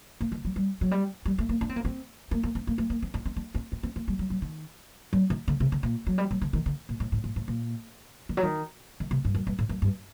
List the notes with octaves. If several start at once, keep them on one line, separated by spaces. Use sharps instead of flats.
A#3
D#3
F#3
G3
F#3
G3
G3
A3
A#3
D4
C4
A#3
C4
A#3
A#3
C4
A#3
A3
A#3
C4
D4
C4
D4
C4
C4
C4
A#3
G3
F#3
F#3
D#3
F#3
D#3
D3
C3
D3
A#2
F#3
G3
F#3
D3
D#3
D3
A#2
A2
A2
A2
A2
A#2
D#3
F#3
D#3
D#3
C3
G2
F#2
G2
A2
F#2
G2